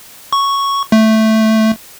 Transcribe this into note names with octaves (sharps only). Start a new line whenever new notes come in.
C#6
A3